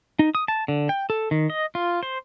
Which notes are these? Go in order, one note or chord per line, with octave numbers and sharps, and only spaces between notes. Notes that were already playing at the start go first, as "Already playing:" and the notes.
D#4
D#6
A5
D3
G5
A4
D#3
D#5
F4
C5